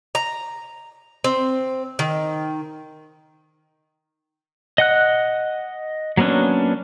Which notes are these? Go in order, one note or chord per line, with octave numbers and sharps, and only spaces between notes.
A#5
C4
D#3
D#5 F#5 F#6
F#3 A#3 B3 C#4 D4